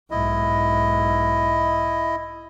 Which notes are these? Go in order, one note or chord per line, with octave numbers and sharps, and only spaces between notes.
B1 G#2 E4 D#5